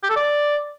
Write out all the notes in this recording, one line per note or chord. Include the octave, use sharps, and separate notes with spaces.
G4
A4
D5